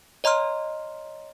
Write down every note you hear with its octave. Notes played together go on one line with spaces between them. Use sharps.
C#5 D#5 A#5 C6 F6